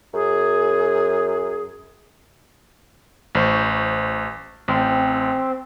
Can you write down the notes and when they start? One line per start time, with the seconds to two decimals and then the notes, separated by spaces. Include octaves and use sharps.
0.14 F#2 G#4
3.35 A1 C5 C#6
4.68 A1 C4